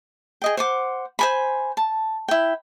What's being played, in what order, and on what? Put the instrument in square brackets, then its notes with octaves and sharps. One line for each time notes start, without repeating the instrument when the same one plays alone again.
[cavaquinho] G#4 D#5 G5
C5 F#5 D6
C5 G#5 B5
A5
E4 G5